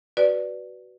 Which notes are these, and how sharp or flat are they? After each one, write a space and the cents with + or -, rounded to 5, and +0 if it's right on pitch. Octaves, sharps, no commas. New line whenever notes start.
F#4 +20 B4 +0 D5 +0